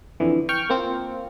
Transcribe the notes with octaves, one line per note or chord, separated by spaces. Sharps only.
F2 D3 E3
G5 C#6 F6
A#3 C4 F4